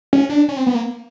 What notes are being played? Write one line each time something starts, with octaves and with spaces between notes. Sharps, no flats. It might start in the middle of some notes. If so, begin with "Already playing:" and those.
C#4
D4
C#4
C4
B3
A#3